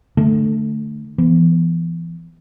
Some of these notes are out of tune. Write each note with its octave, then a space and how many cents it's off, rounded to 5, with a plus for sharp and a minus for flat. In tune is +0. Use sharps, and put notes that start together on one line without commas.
D3 +20 A3 +0
E3 +35 B3 +0